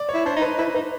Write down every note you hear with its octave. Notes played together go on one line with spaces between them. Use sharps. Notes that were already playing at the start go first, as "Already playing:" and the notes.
Already playing: D5
C#5
E4
D4 C5
D#4
B4
E4 B4
D#4 B4